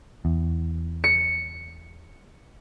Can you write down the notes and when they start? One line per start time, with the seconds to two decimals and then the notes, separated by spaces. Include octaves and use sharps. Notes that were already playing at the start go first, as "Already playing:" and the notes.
0.25 E2
1.04 C#7